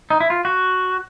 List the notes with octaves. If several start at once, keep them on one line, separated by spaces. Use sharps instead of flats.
D#4
E4
F4
F#4